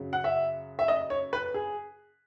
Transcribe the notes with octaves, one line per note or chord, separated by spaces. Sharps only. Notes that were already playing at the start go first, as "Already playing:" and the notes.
Already playing: F#2 C#3 F#3
F#5
E5
E5
D#5
C#5
B4
G#4